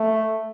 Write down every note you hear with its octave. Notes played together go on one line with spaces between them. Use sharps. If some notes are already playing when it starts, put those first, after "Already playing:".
Already playing: A3